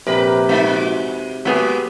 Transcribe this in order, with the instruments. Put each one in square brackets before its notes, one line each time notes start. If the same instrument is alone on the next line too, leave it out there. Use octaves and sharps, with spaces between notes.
[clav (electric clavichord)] A#1 [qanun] C3 G4 B5 [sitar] A#4 B4
[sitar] G#3 D#4 [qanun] F5
[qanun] F#4 D6
[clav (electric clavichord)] F#3 B3 G#4 [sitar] G#3 [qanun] A#3 G4 A#4